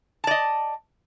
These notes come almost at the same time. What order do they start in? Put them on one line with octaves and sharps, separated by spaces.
A5 D5 D#5